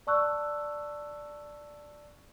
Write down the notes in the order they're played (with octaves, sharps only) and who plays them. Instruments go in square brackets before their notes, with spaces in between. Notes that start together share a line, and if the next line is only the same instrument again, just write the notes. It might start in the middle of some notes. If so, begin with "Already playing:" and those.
[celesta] D5 A5 C#6 E6 F#6